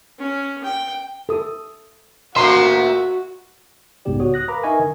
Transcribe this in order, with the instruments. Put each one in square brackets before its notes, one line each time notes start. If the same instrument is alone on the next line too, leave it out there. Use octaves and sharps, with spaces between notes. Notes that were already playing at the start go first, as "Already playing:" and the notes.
[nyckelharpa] C#4
G5
[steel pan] A4 D#6
[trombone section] D2 A#2 A#4 [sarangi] F#4 [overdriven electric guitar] E5 A#5 [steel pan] C6
[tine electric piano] C2 G#2 C#3 B3 G4 D5
F#4 C#5 D#6
D#6 F#6 A#6
A#4 B4 F5 A#5 B5 D6
D#4 A#4 D#5 E5 G#5 C#6
D3